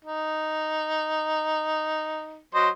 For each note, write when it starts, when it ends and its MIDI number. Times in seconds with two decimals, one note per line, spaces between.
0.04 2.41 63
2.55 2.69 54
2.55 2.69 72
2.55 2.69 75